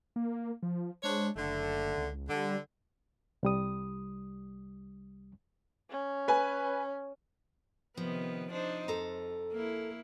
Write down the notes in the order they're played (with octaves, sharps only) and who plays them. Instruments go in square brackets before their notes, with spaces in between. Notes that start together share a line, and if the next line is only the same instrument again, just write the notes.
[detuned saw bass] A#3
F3
[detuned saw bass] G#3 [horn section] D4 C5 C#5
[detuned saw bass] F#1 [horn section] D3 A3
[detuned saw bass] C#2
[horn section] D3 [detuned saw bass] G3
[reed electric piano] C2 G3 D#6
[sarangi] C#4
[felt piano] B4 G#5
[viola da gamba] C3 D#3 B3 [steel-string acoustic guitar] F3
[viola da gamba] D4 D#4 C5
[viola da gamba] F2 [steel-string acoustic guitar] A4 A#5
[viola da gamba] A#3 E4